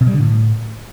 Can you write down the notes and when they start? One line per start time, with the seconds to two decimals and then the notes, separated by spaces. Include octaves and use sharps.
0.01 B2
0.07 G3
0.14 D3
0.20 A2